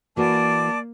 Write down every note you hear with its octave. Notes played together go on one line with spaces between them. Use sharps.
E3 A#3 F#4 B4 D5 A5 D6